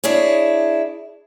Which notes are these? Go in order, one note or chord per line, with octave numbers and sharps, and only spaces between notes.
D4 E4 G#4 C#5